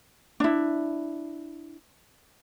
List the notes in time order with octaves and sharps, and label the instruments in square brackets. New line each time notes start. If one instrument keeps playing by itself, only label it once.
[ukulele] D4 E4